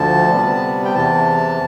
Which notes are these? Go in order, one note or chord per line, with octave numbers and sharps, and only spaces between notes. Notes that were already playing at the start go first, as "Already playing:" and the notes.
Already playing: D2 D3 F3 A5
C3 G3 B3
G5
E2 C3 E3 A5